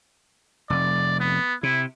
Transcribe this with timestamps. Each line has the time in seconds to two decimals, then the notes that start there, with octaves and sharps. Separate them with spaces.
0.70 F1 D5
1.20 B3
1.63 C3 E4